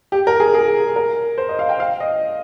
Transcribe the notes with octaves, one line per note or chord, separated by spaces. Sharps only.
G4
A#4
G#4
G#4
A#4
C5
D#5
F5
G5
F5
D#5